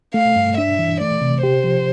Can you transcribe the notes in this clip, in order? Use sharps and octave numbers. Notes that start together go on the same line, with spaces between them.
A3 F5
G2
D4 E5
E3
A3 D5
C3
G4 C5
F3